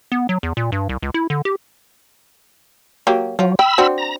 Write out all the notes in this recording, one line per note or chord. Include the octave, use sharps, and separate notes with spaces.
B3
F#3
E2
A#2
G2
C2
C#2
E4
D3
G4
F#3 A#3 G4
F3 F#3
G5 B5 E6
C4 D4 F#4
A#5